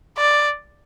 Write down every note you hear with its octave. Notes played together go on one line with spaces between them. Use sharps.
D5